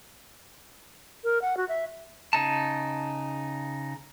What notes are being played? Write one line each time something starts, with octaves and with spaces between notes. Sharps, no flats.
A#4
F#5
F#4
E5
C#3 D#4 A5